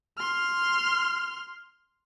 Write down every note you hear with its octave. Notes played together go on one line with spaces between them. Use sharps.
C6 F6